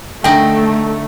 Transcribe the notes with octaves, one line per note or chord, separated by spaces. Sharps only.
D3 A3 D#4 G5